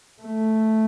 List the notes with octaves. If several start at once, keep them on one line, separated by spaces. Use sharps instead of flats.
A3